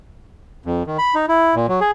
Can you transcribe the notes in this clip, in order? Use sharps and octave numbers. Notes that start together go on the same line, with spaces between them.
F2
D#3
B5
D#4
E4
A#2
F#3
G#4